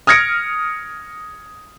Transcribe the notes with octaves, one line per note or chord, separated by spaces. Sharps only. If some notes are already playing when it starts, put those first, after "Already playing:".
D#6 F6 G#6 A#6 C#7 D7